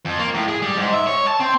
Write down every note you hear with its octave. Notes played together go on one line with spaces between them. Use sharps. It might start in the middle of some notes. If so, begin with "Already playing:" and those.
F2
A#3
A2
G#4
G3
G#2
E5
C#5
A5
C4